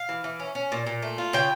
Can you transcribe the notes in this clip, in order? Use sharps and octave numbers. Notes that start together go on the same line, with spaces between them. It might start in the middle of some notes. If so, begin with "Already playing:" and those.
Already playing: F5
E3
E3
C#4
C#4
A#2
A#2
A3
F4
C#3 G5